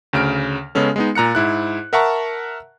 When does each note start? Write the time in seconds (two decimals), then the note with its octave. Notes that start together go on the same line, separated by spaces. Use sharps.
0.13 D2 C#3 F6 D7
0.75 C#3 G#3 B3 C#4 A4
0.96 G#3 B3 D#4
1.15 A#2 A#5 F#6 C#7
1.35 G#2 E4 F#6
1.93 A#4 E5 F#5 A5 A#5 C#6